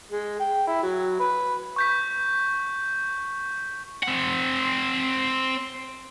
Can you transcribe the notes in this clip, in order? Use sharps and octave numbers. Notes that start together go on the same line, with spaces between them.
G#3
G5
E4
F#3
B4
C#6 G6 B6
C4 F#5